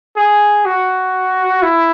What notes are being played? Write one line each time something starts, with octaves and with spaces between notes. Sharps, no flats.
G#4
F#4
E4